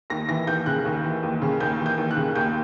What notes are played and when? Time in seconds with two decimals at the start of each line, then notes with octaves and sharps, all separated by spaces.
0.10 D#2 A#6
0.29 E3 A#6
0.47 D#2 G6
0.66 C#3 F#6
0.85 D#2
1.04 E3
1.23 D#2
1.42 C#3
1.60 D#2 G6
1.80 E3
1.86 G6
1.98 D#2
2.11 F#6
2.17 C#3
2.35 D#2 G6